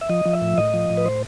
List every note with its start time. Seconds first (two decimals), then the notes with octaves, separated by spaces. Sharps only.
0.01 E5
0.09 F3 D#5
0.25 F3
0.33 E5
0.42 A2
0.58 A2 D#5
0.74 F3
0.90 A2
0.97 B4
1.06 C5